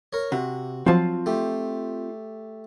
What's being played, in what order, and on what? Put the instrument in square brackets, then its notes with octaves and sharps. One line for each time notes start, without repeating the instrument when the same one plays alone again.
[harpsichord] A#4 C#5
[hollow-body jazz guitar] C3 [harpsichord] F#4
[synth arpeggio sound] F3 F#3 [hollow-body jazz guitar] C4 F4 A5
[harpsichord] A3 G4